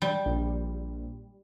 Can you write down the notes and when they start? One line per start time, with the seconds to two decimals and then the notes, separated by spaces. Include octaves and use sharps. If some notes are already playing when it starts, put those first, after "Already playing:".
0.02 G3
0.26 A#1